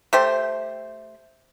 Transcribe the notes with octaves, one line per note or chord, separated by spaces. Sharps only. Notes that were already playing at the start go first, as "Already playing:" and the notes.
A3 G4 C5